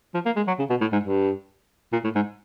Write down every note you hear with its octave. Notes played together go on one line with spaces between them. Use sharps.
F3
A#3
G#3
F#3
C#3
B2
A2
G#2
G2
A#2
A2
G#2